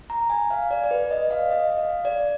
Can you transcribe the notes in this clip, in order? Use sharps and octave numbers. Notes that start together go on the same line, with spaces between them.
A#5
G#5
F5
D5
D5
B4
D#5
F5
D#5
F5
D5